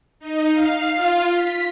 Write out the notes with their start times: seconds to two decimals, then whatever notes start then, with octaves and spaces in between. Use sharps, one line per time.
0.19 D#4
0.52 F5
0.95 F4
1.32 B6